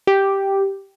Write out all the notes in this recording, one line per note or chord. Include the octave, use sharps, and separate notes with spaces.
G4